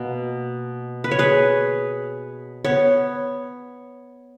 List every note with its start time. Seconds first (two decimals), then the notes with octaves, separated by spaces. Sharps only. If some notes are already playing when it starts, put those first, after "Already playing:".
Already playing: B2 A#3
1.04 B4
1.11 C#5
1.19 G#4 B4
2.65 B3 C#5